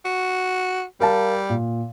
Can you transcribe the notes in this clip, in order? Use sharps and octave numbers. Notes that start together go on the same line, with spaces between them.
F#4
G3 A#4 F5 A5
A#2